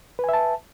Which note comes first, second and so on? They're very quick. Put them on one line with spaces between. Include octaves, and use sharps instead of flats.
B4 G#5 E5 A5